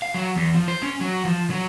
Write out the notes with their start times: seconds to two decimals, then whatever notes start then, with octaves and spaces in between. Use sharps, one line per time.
0.02 F5
0.14 F#3
0.36 E2
0.54 F3
0.68 C5
0.83 C#4
1.01 F#3
1.25 F3
1.50 F#3